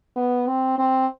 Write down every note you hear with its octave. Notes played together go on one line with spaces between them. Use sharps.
B3
C4
C4